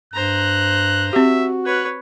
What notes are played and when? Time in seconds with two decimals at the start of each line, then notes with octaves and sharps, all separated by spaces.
0.14 G2 C5 A#5 F#6
1.13 C4 F#4 G4 E5
1.66 B4 C#5 F#6